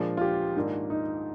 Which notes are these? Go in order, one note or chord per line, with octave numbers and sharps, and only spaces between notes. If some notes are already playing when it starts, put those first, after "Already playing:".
Already playing: A#2 F3 G#3 D4
F4
G4
G#2 D#3 A#3 D4
D#4